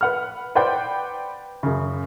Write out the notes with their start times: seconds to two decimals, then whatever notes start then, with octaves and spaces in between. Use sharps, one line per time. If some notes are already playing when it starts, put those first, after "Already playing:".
0.01 B4 F#5 F6
0.55 B4 C5 D5 F#5 G5
1.63 F#2 C#3